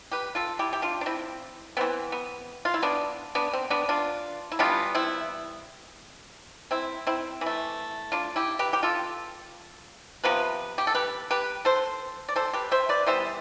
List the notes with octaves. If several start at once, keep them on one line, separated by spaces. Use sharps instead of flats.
G4 B4
F4 A4
E4 G4
G4
D4 F4
D4
C4 E4
E3 B3 C4
B3
F4
E4
B3 D4
B3 D4
C4
B3 D4
D4 F4
E4
E3 G3 B3 D4 F4
C4 E4
C4 E4
C4 E4
E3 A3
D4 F4
E4 G4
G4 B4
G4
F4 A4
C3 F3 B3 B4
G4
A4
G4 B4
G4 B4
A4 C5
D5
A4 C5
G4 B4
C5 E5
B4 D5
E3 G3 B3 C5 E5